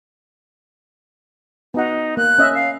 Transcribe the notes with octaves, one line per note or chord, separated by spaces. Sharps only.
B3 D#4 F#4 F#5
A#3 F#6
C#4 D#5 E5
F5